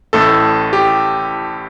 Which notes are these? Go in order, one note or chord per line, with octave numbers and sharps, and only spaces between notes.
A1 A2 A3 A4
G4